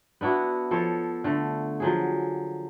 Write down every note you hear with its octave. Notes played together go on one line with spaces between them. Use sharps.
B3 D4 E4 F#4
F3 A4 C#5
D3 A3
F3 F#3 G#4